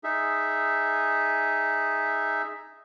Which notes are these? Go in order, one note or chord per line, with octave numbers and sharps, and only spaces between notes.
D#4 G#4 E5